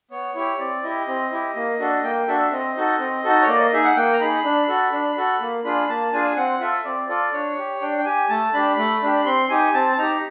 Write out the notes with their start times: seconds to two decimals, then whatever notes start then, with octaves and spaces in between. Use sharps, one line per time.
0.11 B3 C#5
0.35 E4 G4 C#5
0.59 C4 D5
0.84 E4 G4 D#5
1.07 C4
1.32 E4 G4
1.56 A#3
1.79 D4 F#4 A4
2.03 A#3 G5
2.28 D4 F#4 A4 E5
2.52 C4 D#5
2.76 D#4 F#4 A4
2.99 C4
3.24 D#4 F#4 A4
3.42 C#5
3.48 A#3 D5
3.60 D#5
3.73 D#4 G#4 E5
3.84 F#5
3.96 A#3 G5
4.13 A#5
4.20 D#4 G#4 B5
4.44 D4
4.68 F#4 A4
4.92 D4
5.17 F#4 A4
5.40 A#3
5.64 D4 F4 G#4 B5
5.89 A#3 A5
6.13 D4 F4 G#4 G#5
6.36 C4 F#5
6.60 F4 A4 E5
6.85 C4 D5
7.09 F4 A4 D5
7.33 D4 C#5
7.58 G4
7.81 D4 G5
7.98 G5
8.05 G4 G#5
8.29 A3 A5
8.53 D4 G4 B5
8.77 A3
9.02 D4 G4
9.26 C4 C6
9.49 D#4 G4 G#5
9.74 C4 A5
9.92 A5
9.98 D#4 G4 A#5